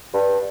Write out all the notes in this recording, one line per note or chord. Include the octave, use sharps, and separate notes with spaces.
G2